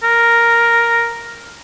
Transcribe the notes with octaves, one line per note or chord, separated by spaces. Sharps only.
A#4